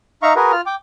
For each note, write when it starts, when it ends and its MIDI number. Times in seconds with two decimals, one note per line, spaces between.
0.23 0.33 63
0.23 0.33 76
0.23 0.33 77
0.23 0.33 82
0.23 0.33 85
0.36 0.52 66
0.36 0.52 68
0.36 0.52 70
0.36 0.52 71
0.52 0.61 65
0.52 0.61 89
0.66 0.75 79
0.66 0.75 86